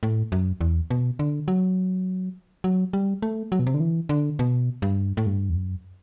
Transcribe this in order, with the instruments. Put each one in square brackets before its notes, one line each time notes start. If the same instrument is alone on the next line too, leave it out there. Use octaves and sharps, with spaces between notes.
[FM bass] A2
F#2
E2
B2
D3
F#3
F#3
G3
A3
F#3
B2
C3
D3
E3
D3
B2
G2
A2
G2
E2
F#2